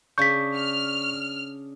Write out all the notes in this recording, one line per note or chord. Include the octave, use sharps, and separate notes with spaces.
C#3 D4 C#6 G6 B6
F6